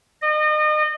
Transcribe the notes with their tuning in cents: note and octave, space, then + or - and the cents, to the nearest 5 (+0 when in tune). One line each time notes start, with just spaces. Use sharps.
D#5 -35